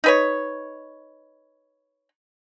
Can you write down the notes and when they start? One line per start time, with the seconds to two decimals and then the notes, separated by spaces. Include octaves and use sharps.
0.04 D#4 B4 C#5